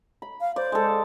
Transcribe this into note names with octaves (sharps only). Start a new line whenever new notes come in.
B5
F5
C5 D5
G#3 A4